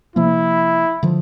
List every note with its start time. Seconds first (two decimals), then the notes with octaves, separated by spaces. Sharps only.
0.16 C3 F3 A#3 E4
1.03 D3 F3